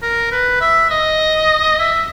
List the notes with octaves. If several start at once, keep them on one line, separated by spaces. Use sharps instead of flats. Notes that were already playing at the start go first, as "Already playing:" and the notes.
A#4
B4
E5
D#5
E5